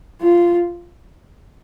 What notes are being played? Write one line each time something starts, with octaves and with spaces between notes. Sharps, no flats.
F4